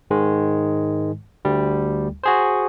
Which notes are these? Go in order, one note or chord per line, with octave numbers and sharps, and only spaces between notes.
G#2 D#3 G#3
D2 G3
F#4 G#4 C5